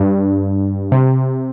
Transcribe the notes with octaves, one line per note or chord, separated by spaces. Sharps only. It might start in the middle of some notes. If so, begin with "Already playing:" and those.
Already playing: G2
C3